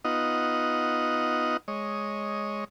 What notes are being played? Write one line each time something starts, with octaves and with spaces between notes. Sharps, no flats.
B3 D#4 F4 D#5 F#5
G#3 C#5 D#5